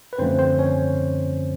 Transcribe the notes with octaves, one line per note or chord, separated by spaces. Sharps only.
B4
F#2 D3 F3 A3 C4 C#4 C5
C4 C5
C#4 C#5